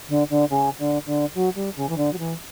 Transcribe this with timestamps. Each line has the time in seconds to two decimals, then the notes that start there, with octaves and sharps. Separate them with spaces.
0.09 D3
0.30 D3
0.50 C#3
0.79 D3
1.06 D3
1.35 F#3
1.55 G3
1.76 C#3
1.89 E3
1.97 D3
2.13 F#3
2.18 E3